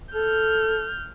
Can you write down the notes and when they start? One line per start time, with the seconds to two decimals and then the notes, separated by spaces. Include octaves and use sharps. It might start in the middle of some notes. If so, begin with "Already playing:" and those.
0.13 A4 F6 G6